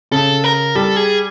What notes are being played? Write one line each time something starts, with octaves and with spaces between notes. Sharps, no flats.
C#3 A4
A#4
G3 A4
G#4